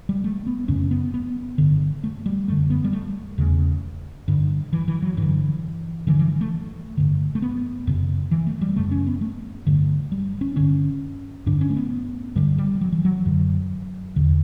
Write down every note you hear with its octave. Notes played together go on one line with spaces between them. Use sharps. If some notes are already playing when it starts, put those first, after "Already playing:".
G3
A3
B3
F#2 C#3 C#4
B3
B3
G2 D3
A3
G3
F#2 D3 A3
B3
G3
A3
E2 C#3
G2 D3
E3
E3
F#3
G2 D3 E3
G2 D3 E3
E3
A3
G2 D3
A3
B3
F#2 C#3
E3
A3
G3
F#2 C#3 A3
C#4
B3
A3
G2 D3
G3
C#4
G2 D3 C#4
G2 D3 D4
C#4
A3
B3
G2 D3 G3
G3
F#3
E3
F#3
F#2 D3
E2 D3